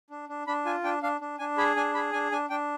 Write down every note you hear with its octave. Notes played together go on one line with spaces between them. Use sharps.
D4
D4
D4 B5
F4 G#5
D4 G5
D4 F5
D4
D4 G#5
G#4 B5
D4 G#5
G#4 B5
D4 G#5
D4 G#5
D4 G5